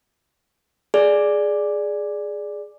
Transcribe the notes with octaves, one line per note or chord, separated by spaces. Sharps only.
G#4 D5